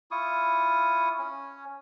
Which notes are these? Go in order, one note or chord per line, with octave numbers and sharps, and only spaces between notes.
E4 F4 C#6 D#6
C#4